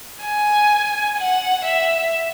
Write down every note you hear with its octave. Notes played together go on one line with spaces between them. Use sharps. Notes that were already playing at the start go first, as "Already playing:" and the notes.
G#5
F#5
E5